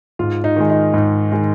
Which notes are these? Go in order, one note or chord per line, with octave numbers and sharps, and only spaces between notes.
G#2 F4
D#4
D#3 G#3
D#4
G#2
D#3 G#3